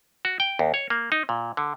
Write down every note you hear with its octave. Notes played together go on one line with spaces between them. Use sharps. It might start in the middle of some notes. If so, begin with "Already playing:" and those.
F#4
G5
D#2
C#5
A#3
D#4
A#2
D3